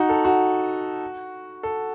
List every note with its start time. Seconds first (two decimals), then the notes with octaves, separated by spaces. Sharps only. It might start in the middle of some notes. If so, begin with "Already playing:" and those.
Already playing: D#4 F#4
0.09 A4
0.24 F#4
1.63 A4